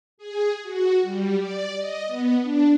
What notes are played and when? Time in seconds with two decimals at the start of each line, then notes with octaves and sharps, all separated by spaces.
0.18 G#4
0.63 F#4
1.02 G3
1.37 D5
1.76 D#5
2.07 B3
2.42 D4